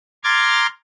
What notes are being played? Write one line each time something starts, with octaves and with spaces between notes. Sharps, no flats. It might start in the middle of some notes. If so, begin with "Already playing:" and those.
A#5 C6 D6 F6 G#6 A6